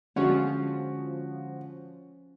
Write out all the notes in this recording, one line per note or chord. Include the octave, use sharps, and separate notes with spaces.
D3 F3 G#3 C#4 F#4